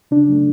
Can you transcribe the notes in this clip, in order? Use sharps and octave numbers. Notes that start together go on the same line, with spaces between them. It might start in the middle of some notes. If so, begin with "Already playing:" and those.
C#3 D4
F#3 A3